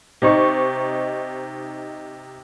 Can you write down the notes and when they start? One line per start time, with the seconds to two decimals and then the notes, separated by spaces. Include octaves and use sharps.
0.22 C3 D#4 C#6